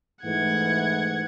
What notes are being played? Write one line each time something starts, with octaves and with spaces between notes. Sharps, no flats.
G#2 E3 A3 F#5 G#6